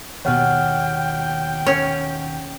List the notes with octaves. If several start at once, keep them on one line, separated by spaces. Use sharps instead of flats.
D#2 B2 C#5 F#5 G5 F6
C#4